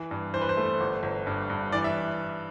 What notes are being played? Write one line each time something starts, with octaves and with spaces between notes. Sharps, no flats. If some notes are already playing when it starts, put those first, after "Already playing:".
Already playing: E3
G2
E3 C5
B4
C5
A3
G1
G1
G2
G2
E3 D5
E5